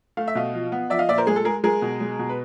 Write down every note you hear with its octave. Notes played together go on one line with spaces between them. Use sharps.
A3 F5
E5
B2 D#5 F5
F3
B3
F3 D5 E5
D#5 F5
A#2 D5 E5
A#4 C5
G#3 G#4
A4
G#3 G#4 A#4
G#3 G#4 A#4
B2
G#3
B2
B4